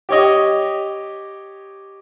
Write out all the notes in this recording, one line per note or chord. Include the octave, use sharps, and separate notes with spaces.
G4 C#5 D#5